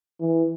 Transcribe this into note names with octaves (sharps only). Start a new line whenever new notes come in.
E3